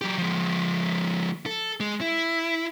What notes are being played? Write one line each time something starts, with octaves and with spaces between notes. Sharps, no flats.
F#3 G4
F3 G#3
A4
G#3
E4